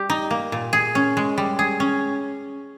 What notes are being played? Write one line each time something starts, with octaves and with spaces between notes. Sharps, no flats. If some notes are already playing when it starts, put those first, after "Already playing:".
Already playing: G3 G4
D#4
A#3
A#2
G#4
C#4
G#3
G3
G#4
C#4